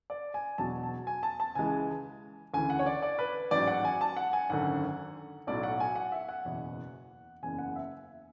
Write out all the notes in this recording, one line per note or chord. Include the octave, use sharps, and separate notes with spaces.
D5
G#5
E1 E2 B2 F#3 A5
A5
G#5
A5
A5
C#2 C#3 E3 G#3 G#5
D2 C#3 E3 G#5
F#5
C#5
D5
D5
B4
A1 G#2 F#3 D5
F#5
G#5
A5
F#5
G#5
G#1 F#2 D3 F#5
B1 A2 F#3 D5
F#5
G#5
F#5
E5
F#5
F#1 E2 B2
F#1 E2 C#3 G#5
F#5
E5